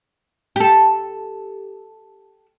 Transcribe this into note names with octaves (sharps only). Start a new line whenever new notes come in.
G4 A4